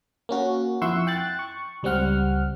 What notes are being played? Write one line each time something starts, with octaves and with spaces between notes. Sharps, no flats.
A#3 C#4 F#4
F2 E4 F#5 C6 C#6 E6
G5 F#6 A6
C#6
C#2 G3 C4 F#5 F6